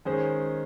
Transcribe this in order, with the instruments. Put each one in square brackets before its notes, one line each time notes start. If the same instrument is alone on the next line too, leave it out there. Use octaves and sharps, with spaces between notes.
[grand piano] D#3 G#3 C#4 G#4 C5